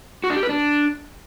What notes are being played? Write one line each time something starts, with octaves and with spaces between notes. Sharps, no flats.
F#4
D4
G4
B4
D4